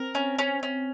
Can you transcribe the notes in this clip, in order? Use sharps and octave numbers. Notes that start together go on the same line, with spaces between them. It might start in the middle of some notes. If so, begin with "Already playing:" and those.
Already playing: C4 A#4
C#4
C#4
C#4